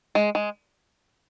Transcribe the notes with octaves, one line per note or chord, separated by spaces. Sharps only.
G#3
G#3